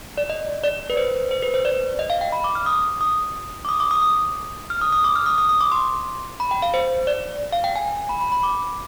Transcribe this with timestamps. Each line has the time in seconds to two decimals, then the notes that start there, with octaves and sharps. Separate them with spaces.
0.18 D5
0.30 D#5
0.64 D5
0.90 B4
0.97 C5
1.31 C5
1.43 B4
1.54 C5
1.65 D5
1.99 D#5
2.10 F5
2.21 G5
2.32 B5
2.44 D6
2.55 F6
2.66 D#6
3.01 D#6
3.65 D6
3.69 D#6
3.80 D6
3.91 D#6
4.02 D#6
4.70 F6
4.81 D#6
4.93 D#6
5.04 D6
5.16 F6
5.26 D#6
5.38 D#6
5.49 D#6
5.61 D6
5.72 C6
6.40 B5
6.51 G5
6.62 F5
6.74 C5
7.07 D5
7.53 F5
7.64 G5
7.76 G#5
8.09 B5
8.21 B5
8.32 B5
8.43 D6